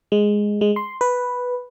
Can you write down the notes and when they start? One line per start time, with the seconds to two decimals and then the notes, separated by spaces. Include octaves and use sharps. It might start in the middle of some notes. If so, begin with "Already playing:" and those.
0.12 G#3
0.61 G#3
0.76 C6
1.01 B4